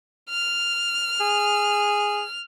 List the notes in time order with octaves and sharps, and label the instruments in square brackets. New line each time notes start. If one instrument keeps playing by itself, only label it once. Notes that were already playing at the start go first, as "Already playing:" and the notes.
[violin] F6
[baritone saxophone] G#4